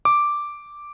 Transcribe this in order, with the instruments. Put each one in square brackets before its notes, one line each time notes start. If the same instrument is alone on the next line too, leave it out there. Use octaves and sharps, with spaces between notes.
[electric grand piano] D6